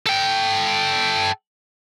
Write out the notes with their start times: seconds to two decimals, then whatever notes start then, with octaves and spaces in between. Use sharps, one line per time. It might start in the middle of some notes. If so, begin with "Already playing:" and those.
0.07 A4 G5